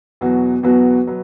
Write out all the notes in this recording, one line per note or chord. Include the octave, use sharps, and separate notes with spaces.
E2 B2 F#3 B3 F#4
E2 B2 F#3 B3 F#4
B2 F#3 B3